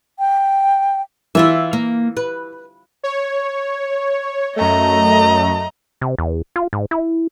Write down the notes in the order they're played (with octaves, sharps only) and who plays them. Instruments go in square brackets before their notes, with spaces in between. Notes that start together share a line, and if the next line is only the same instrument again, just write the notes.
[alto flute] G5
[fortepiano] E3 [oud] E4 F4 E5
[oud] A#3
B4
[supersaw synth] C#5
[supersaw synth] F#2 A3 [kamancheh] D#5 A#5
[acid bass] C3
E2
F4
G#2
E4